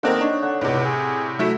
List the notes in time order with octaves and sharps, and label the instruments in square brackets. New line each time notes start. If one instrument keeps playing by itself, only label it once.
[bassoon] D#3 [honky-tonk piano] A#3 C4 A#4 [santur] D4 D#4 F#5
[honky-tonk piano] D4 [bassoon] D#4 [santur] C#5
[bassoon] D3 [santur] F#5
[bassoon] C#2 [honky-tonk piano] A2 C3 [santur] D5 F#5
[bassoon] G#4
[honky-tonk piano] F#3 A3 [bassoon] E4